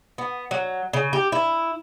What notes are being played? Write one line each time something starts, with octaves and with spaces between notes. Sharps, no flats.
B3
F#3
C#3
G4
E4